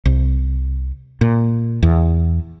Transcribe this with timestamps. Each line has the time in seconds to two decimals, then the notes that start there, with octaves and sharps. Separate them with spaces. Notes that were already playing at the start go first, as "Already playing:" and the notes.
0.05 C2
1.21 A#2
1.83 E2